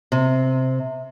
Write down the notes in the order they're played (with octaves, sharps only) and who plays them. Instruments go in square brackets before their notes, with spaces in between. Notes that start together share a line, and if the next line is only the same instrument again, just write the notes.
[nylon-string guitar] C3